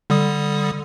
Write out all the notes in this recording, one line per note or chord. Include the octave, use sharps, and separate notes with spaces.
D3 G3 D#6